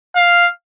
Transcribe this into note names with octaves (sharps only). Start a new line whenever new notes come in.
F5